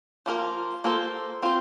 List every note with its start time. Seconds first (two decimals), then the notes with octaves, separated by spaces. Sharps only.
0.26 F3 A#3 F4 A#4
0.84 A#3 F4 A4 C5
1.42 C4 F4 C5